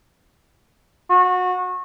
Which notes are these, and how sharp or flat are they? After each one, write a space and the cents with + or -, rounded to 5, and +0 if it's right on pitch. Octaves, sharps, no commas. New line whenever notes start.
F#4 -25